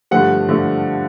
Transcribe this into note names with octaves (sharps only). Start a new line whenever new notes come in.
G2 D3 F3 A3 F#5
D3 F3 A3